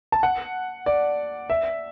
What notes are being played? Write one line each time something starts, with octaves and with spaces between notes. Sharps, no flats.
A5
F#5
D5
E5